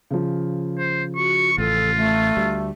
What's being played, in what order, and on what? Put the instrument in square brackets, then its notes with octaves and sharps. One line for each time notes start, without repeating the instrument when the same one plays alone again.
[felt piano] C#3 F3
[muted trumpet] C5
[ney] F#4 [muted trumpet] C#6
[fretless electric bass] A1 [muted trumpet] F4 [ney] A4
[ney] A3
[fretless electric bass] D2 G3